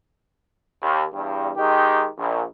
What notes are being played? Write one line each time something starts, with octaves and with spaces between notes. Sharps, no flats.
D#2
E2 G2
D#3 G#3 D#4 G4
A#1